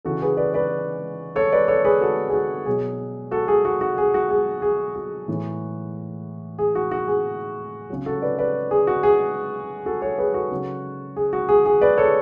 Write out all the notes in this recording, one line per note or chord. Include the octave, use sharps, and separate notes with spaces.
C#3 E3 F#4 A4
G#4 B4
B4 D5
B4 D5
A4 C#5
B4 D5
A4 C#5
G#4 B4
F#4 A4
G#4
F#4
B2 F#3 G#4
F#4 A4
G#4
F#4
F#4
G#4
F#4
G#4
G#4
F#4
A2 E3
G#4
F#4
F#4
G#4
C#3 F#3
F#4 A4
B4 D5
B4 D5
G#4
F#4
G#4
F#4 A4
A4 C#5
G#4 B4
F#4 A4
C#3 F#3
G#4
F#4
G#4
G#4
B4 D5
A4 C#5